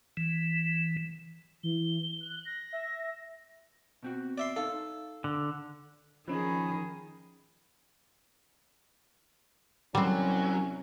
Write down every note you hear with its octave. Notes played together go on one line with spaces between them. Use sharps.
E3
E3 G7
F#6
A#6
E5
B2 C4 F#4
D5 E5 C6
D#4 A4 F5
D3
D#3 F3 C#4 D#4 G#4 B5
C2 F#3 G3 C4 C#4